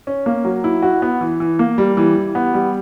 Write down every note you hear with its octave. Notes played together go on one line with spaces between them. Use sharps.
C#4
A#3
F#3
E4
F#4
B3
E3
E3
A#3
G3
E3
E3
B3
G3